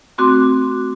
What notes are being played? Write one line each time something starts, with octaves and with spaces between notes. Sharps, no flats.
A3 C4 F#4 C6 D6